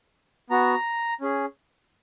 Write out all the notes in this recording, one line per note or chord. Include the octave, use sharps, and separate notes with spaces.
B3 F#4 A#5
C#4 G#4